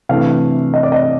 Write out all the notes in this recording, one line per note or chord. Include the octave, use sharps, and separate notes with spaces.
C3 E3 A3 D4 F5
D#5
D5
D#5